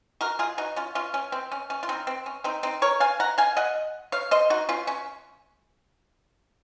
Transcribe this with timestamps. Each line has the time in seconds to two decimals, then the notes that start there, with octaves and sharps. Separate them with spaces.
0.21 F#4 A#4
0.39 F4 G#4
0.58 D#4 F#4
0.76 C#4 F4
0.95 C#4 F4
1.14 C#4
1.32 C4
1.52 C#4
1.70 C#4
1.83 F4
1.89 C4 D#4
2.07 C4
2.26 C#4
2.44 C4 D#4
2.63 C4 D#4
2.82 A#4 C#5
3.00 F5 G#5
3.20 F#5 A#5
3.38 F5 G#5
3.57 D#5 F#5
4.12 C#5 F5
4.31 C5 D#5
4.50 D#4 F#4
4.69 C#4 F4
4.87 C#4